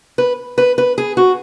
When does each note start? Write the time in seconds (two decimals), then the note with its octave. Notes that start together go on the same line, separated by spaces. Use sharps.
0.18 B4
0.58 B4
0.78 B4
0.98 G#4
1.17 F#4